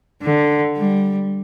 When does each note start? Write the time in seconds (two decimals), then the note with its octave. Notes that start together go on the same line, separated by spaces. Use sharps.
0.22 D3
0.77 G3